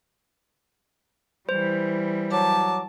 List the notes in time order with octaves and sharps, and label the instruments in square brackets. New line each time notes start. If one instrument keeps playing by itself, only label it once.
[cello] E3 G3 [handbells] C5
[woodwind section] F#3 D6 [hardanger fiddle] A5